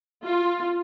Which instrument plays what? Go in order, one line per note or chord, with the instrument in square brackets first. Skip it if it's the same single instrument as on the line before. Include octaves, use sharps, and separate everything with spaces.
[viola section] F4